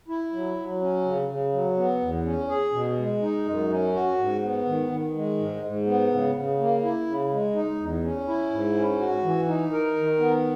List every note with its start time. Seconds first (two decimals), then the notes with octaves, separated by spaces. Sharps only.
0.08 E4
0.32 F#3
0.57 F#3
0.81 C#4
1.05 C#3
1.28 C#3
1.52 F#3
1.77 B3
2.01 E2
2.24 C#4
2.49 G#4
2.73 B2
2.97 G#3
3.22 D#4
3.46 F#2
3.70 C#4
3.94 F#4
4.18 G#2
4.42 B3
4.66 D#3
4.91 D#3
5.14 G#3
5.38 G#2
5.62 G#2
5.86 B3
6.11 C#3
6.34 C#3
6.59 A#3
6.83 E4
7.07 C#3
7.31 G#3
7.55 D#4
7.80 E2
8.03 C#4
8.27 E4
8.51 G#2
8.76 C#4
9.00 F#4
9.23 E3
9.47 D#4
9.72 A#4
9.96 D#3
10.19 B3